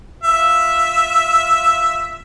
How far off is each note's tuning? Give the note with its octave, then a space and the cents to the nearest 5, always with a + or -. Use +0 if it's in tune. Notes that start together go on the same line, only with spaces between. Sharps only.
F4 +0 E5 +0